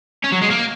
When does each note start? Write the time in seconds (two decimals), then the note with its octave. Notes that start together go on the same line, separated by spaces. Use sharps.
0.24 C#4
0.32 F#3
0.41 G#3
0.50 A#3